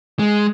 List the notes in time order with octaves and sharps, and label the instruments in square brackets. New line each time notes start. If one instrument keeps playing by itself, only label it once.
[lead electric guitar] G#3